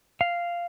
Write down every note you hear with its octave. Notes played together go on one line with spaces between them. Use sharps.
F5